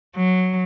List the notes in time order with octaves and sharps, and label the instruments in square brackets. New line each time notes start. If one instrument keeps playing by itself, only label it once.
[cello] F#3